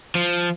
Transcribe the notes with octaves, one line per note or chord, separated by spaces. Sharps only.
F3